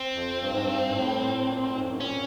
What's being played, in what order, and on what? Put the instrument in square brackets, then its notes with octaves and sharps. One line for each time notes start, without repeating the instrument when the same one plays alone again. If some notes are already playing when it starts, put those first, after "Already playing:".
Already playing: [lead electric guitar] C4
[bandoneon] F2
G2
G#2
G2
G#2
A2
A2
A#2
A2
G#2
F2
F#2
[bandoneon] A#2 [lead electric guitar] C#4